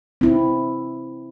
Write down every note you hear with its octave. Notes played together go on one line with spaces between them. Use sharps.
C4 E4